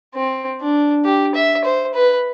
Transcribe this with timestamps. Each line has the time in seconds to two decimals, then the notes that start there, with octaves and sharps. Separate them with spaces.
0.15 C4
0.60 D4
1.05 G4
1.35 E5
1.64 C5
1.94 B4